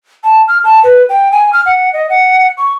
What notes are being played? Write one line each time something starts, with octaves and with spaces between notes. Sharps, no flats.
A5
F6
A5
B4
G5
G#5
F6
F#5
D#5
F#5
C#6